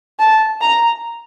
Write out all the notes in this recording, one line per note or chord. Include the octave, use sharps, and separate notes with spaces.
A5
A#5